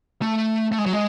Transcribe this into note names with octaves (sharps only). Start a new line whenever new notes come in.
A3
A3
G#3
F#3
G#3